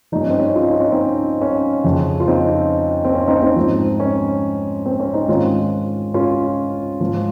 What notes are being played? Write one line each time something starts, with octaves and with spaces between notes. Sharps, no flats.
G2 F3 D#4
C#4
C4
C#4
F4
D#4
C#4
C4 D#4
C#4
F2 C#3 F3
F4
C4 D#4
C4
C#4
C4 D#4
C4 D#4
G#2 F3
C#4
C4
C#4
C4 D#4
G#2 D#3 C#4 F4
C#4 F4
G#2 F3